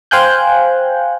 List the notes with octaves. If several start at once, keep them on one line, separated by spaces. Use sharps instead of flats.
C5 F5 G5 G#5 F#6 G6